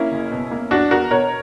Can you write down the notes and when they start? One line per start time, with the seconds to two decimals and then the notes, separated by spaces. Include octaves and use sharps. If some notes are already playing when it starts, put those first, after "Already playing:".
Already playing: A#3 C#4 E4
0.12 F#1
0.31 B2
0.51 A#3
0.71 E2 D4 F#4
0.91 E2 F#4 A#4
1.10 B2 A#4 C#5